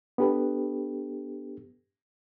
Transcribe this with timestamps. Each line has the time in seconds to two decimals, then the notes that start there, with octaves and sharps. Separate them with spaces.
0.18 B3 D4 G4 A4 B4